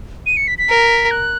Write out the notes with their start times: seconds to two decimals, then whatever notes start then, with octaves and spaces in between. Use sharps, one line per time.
0.26 D#7
0.37 C#7
0.48 B6
0.58 B6
0.68 A#4
1.11 F#6